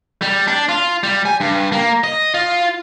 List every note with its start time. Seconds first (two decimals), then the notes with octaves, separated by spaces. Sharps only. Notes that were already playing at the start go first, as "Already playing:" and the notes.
0.22 G3
0.47 D4
0.69 F4
1.03 G3
1.26 G#5
1.40 G2
1.72 A#3
2.04 D#5
2.34 F4